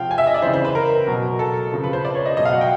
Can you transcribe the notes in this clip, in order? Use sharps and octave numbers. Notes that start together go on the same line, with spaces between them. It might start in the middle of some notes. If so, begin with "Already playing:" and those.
Already playing: C3 F3 F5 G5
G#5
E5
D#5
D5
C#3 E3 C5
C5
B4
A#4
B2 F#3
A4
C#3 F3
B4
C5
D5
C#5
D#5
B2 F#3 D#5
F5
F#5
G5